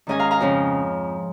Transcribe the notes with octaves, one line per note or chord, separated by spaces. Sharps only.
G#2 D#3 C#4 D#5 G#5
F5 A#5
F5 A#5
F2 C#3 F3 C#4